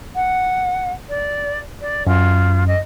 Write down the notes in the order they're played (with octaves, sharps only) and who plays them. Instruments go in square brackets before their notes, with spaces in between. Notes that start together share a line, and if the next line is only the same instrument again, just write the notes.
[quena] F#5
D5
D5
[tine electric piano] F#2 [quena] F4
[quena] D#5